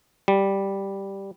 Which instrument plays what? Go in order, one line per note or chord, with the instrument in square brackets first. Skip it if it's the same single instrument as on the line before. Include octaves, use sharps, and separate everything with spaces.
[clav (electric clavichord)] G3